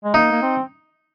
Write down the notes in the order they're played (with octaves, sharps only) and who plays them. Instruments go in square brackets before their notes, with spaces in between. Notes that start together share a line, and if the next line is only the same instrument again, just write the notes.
[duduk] G#3
[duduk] A#3 [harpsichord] D#4
[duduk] A#3
C4